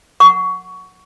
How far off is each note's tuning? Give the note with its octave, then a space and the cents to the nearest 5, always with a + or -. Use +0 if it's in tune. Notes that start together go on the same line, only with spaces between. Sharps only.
F#5 +0 C#6 +15